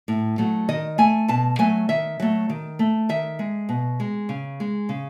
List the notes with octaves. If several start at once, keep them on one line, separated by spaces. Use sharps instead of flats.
A2
F#3 A3
D#3 D#5
A3 G#5
B2 A5
F#3 A3 G#5
D#3 E5
F#3 A3
D#3
A3
D#3 E5
G#3
B2
G#3
C#3
G#3
C#3